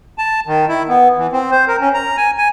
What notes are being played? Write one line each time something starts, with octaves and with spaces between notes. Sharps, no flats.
A5
D#3
E4
B3
E3
C4
C5
A#4
C#4
A#5
G#5
G#5